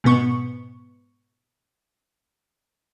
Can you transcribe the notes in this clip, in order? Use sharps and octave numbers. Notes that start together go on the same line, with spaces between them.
G#2 B2 B3 C#6